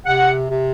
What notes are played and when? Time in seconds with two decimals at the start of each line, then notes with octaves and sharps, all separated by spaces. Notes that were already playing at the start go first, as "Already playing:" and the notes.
0.06 C3 F#5
0.48 C3